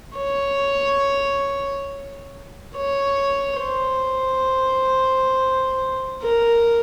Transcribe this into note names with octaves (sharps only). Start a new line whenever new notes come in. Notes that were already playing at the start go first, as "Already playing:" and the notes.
C#5
C#5
C5
A#4